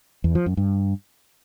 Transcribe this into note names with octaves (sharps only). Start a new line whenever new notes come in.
E2
F3
F#2
G2